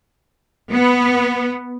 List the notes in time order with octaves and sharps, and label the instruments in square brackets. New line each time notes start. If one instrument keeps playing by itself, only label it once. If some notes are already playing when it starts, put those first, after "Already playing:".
[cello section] B3